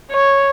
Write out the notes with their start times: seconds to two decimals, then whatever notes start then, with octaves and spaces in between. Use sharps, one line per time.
0.11 C#5